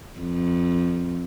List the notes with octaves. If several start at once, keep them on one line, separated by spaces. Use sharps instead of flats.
F2